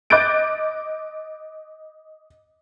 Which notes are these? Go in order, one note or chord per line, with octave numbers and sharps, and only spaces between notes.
D#5 D6 F#6 G6 A6 D7